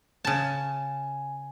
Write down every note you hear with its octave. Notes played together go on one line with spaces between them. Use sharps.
C#3 G#5 A5